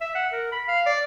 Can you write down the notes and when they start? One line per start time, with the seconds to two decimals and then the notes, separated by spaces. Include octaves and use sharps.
0.01 E5
0.15 F#5
0.33 A#4
0.52 B5
0.68 F5
0.86 D5